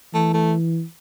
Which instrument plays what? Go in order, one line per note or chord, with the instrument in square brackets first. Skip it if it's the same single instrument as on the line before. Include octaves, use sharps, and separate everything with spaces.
[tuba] E3 [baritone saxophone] A3
[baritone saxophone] A3